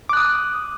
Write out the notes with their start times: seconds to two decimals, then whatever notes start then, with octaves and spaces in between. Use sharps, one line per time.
0.09 D6
0.13 F#6
0.17 D#6